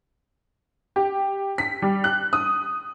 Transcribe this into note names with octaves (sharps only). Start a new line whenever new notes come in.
G4
B6
G3
F#6
D#6